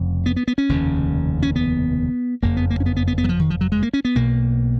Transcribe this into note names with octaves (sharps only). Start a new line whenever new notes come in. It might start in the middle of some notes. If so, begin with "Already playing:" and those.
Already playing: F1 F2 C#3
B3
B3
B3
C#4
F1 D#2 C#3
C#4
B3
F#1 F2 C#3 A#3
B3
A#3
C#4
B3
B3
B3
B3
F#3
F3
D#3
F3
F#3
G#3
A#3
C#4
B3
B1 B2 A#3